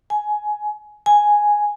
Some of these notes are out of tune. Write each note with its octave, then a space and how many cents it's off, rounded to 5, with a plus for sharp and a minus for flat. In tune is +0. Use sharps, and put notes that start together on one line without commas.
G#5 +15
G#5 +0